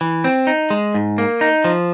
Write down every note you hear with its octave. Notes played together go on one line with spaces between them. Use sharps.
E3
C4
D#4
G#3
G#2
A#3
D#4
F3